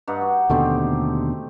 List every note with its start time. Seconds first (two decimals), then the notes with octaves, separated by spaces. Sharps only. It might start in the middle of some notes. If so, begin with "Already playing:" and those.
0.07 G2 D#4 F#5
0.21 F#4
0.50 D#2 B2 D3 A3 C4 G4